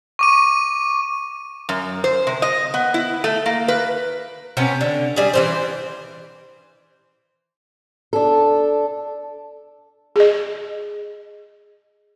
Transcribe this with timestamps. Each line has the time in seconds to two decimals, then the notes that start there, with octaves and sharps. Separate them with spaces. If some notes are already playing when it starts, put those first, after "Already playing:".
0.19 C#6 D6 D#7
1.69 F#2
2.04 C5
2.27 C3
2.42 D#5
2.74 B3
2.94 E4
3.24 A3
3.46 A#3
3.68 B4
4.57 C3 B3 C#4
4.81 D3
5.16 G3 G#4
5.34 E3 G3 C5
8.13 D4 A4
10.16 G#4 D#5